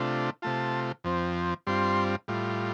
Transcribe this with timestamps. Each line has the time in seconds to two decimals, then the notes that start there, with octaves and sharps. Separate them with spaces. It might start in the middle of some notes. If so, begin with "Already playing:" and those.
Already playing: C3 A3 D4 F4
0.42 C3 A3 F4 A5
1.04 F2 F3 C4
1.67 G2 G3 C4 F4 C6
2.28 A2 G3 F4